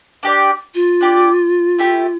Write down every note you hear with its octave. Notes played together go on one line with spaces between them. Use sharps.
D4 G4 D5
F4
D4 G4 D5
A3 E4 G4